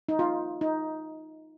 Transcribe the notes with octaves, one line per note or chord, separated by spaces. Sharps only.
D#4
F4
D#4